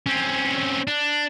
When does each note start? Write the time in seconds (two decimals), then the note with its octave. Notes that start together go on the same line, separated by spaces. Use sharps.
0.06 C4 C#4
0.87 D4